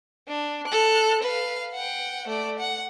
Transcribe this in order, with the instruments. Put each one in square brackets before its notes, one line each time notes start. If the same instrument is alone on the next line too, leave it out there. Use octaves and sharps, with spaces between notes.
[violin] D4
A4 F#6
B4 F5
F#5 G5
A3 D5
F#5